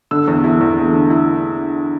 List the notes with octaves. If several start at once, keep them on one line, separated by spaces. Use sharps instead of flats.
D3 E6
E2
E4
E2
A3
D3
E4